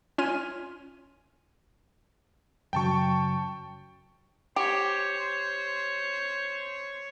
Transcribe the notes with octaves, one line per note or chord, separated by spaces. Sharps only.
C#4 F4 C#5 C6 F6 D#7
F#2 C#3 F#3 G5 A5 C#6
G4 C5 C#5